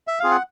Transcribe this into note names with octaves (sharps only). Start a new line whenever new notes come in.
E5
C4 F4 G#4 F5
F#5